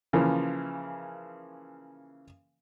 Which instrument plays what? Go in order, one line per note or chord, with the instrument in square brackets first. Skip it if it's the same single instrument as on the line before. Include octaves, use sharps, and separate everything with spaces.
[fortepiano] C#3 E3 F3 A#3